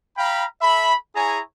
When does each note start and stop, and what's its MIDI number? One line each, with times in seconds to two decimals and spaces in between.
0.18 0.45 77
0.18 0.45 79
0.18 0.45 82
0.18 0.45 83
0.62 0.94 69
0.62 0.94 76
0.62 0.94 83
1.15 1.40 64
1.15 1.40 68
1.15 1.40 73
1.15 1.40 80
1.15 1.40 82